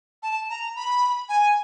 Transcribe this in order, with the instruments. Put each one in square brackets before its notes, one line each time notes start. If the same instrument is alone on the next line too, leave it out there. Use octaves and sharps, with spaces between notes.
[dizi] A5
A#5
B5
G#5